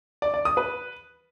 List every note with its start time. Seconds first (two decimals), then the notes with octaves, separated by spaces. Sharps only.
0.22 D5
0.34 D5
0.45 D#6
0.57 B4